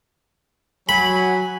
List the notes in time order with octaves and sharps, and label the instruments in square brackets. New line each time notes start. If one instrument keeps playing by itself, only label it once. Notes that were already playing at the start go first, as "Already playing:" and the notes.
[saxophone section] F#3 [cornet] G#5 [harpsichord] B5